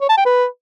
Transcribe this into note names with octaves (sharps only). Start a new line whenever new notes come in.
C#5
A5
G5
B4